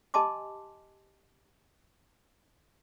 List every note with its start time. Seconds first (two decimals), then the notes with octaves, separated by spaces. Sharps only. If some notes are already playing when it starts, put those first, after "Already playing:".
0.14 G4 D#5 G#5 A5 C6 D6